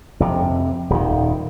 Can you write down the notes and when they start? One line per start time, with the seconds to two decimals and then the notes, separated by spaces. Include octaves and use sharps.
0.20 F2 C3
0.90 D#1 D#3